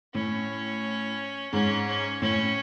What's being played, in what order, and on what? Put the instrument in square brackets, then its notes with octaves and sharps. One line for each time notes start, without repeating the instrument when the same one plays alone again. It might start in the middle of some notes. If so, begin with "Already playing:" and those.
[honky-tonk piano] A2 [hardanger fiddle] C#4
[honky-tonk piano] G#2 [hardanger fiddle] C#4
[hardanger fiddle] C#4
[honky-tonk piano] A2 [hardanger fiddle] C#4